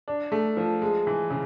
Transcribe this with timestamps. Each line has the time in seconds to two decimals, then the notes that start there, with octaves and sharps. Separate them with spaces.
0.08 D4
0.32 A3
0.57 F3
0.82 G#3
1.07 E3
1.30 C#3